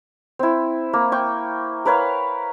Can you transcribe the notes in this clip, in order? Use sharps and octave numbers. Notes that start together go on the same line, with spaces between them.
C4 E4
A#3
G5 C#6
A#4 B4 C#5 F5